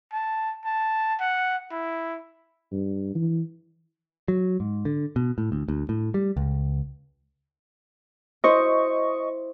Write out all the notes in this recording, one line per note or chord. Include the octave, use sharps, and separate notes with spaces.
A5
A5
F#5
E4
G2
E3
F#3
G#2
D3
B2
A2
D2
D2
A2
G3
C#2
E4 C5 D#5 C#6